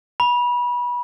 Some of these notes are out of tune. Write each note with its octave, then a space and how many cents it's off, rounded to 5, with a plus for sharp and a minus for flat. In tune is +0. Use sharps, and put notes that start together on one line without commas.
B5 -25